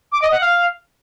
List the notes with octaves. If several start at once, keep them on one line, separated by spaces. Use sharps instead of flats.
D6
D#5
F#5
F5